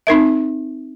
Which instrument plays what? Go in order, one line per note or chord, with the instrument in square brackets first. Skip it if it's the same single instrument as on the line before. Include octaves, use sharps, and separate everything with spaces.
[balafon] C4 D#4 A#4 E5